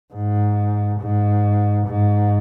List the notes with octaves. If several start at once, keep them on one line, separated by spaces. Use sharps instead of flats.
G#2
G#2
G#2